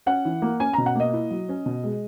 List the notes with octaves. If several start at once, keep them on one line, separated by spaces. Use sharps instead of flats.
C#4 F#5
E3
A#3
C#4 G#5
B2 A#5
F#5
A#3 D#5
E4
F#3
C#4
B2
G#3